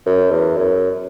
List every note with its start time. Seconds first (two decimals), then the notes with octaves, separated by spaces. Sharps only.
0.06 F#2
0.31 E2
0.56 F#2